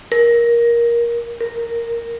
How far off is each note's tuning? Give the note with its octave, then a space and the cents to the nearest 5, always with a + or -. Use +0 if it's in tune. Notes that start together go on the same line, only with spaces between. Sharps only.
A#4 +15
A#4 -5